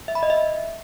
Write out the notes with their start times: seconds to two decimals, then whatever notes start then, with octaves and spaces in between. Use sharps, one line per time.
0.08 E5
0.15 B5
0.23 D#5
0.30 E5